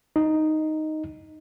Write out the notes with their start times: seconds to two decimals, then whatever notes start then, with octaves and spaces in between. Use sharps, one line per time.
0.16 D#4